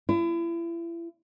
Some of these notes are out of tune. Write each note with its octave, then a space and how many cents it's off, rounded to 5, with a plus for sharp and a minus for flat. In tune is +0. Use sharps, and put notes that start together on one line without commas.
E4 +35